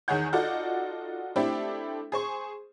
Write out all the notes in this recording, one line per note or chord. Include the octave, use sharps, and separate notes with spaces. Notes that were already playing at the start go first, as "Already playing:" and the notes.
E2 D#3 G#4 C#5 F#5 G6
D#4 F4 F#4 A4 D5 F#5
A3 C4 D4 E4 G4 A4
G#4 C5 C#6